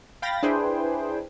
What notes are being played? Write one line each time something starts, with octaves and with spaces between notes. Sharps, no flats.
F5 G5 B5 A6 A#6
D4 E4 G#4 B4 C5 G5